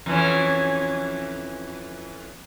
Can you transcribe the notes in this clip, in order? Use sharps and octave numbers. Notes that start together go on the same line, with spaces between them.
F2 E3 C#4